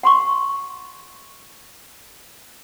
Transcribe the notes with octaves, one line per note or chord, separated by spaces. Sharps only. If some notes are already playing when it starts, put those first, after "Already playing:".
F#5 C6 C#6